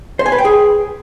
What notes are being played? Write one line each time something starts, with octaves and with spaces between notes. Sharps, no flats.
C5
G#5
B4
G5
G#4